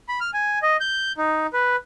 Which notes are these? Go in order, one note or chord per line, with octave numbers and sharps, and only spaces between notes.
B5
F6
G#5
D#5
G6
D#4
B4